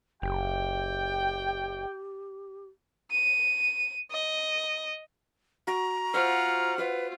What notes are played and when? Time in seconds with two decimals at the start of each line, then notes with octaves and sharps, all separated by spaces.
0.22 F#1 G4 G5
3.12 D#7
4.11 D#5
5.67 F#4 A#5
6.14 F4 C5 E5 F#5 F6
6.78 F4 B4 E5 F#5